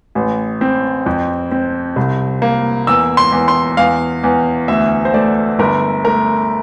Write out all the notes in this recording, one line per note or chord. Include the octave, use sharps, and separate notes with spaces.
A1
C4
F2
C4
C2
A#3
E2 E6
C6
E2
C6
E2 F5
E2
D2 E5
C5
A3 D5
G1 A#4
A3 A#4